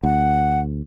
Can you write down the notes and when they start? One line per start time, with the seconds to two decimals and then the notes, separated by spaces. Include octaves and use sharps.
0.03 D2 F#5